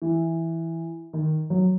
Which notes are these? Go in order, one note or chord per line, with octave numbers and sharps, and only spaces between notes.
E3
D#3
F#3